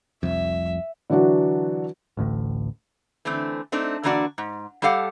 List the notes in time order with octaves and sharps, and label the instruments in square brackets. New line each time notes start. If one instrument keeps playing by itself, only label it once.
[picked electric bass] F1 C2 F2 [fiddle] E5
[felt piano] D3 E3 F#3 D4 F#4
[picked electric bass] A1 D2 A2
[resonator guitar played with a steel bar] D3 E3 A3 C4
A3 C4 D4 D#4
D3 E3 A#3 D4 F#4 D5
G#2
G3 G4 A4 F5 F#5